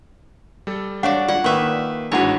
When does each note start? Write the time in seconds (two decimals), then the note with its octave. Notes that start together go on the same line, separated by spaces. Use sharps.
0.67 G3 A4
1.03 D4 F#4 C#5 D5 F5 F#5
1.28 F4 D5 F#5
1.44 D#3 A#3 B4 E5 C#6
2.12 A1 G#2 D4 E4 F#4 B4 C#5 F#5